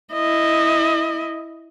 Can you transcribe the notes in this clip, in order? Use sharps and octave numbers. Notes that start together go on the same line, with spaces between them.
E4 D#5